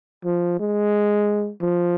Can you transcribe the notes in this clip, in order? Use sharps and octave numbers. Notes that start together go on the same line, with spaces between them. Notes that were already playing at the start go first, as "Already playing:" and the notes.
F3
G#3
F3